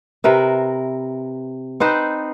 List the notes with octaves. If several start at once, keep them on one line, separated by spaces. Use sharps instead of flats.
C3 A#4 B4 E5
C4 D#4 B4 C5